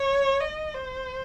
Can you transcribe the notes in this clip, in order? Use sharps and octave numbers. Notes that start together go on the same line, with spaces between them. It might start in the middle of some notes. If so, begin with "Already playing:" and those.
Already playing: C#5
D#5
C5